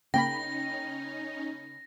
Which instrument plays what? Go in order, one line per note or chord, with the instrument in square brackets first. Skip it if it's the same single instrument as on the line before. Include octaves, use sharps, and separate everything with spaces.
[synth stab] C#3 A#3 B5 [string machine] C#4 D#4 [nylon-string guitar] G5 [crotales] A#6